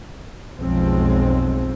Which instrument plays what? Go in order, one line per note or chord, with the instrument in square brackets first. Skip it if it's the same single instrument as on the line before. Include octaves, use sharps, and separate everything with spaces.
[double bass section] B1 F2 F3 G#3 C4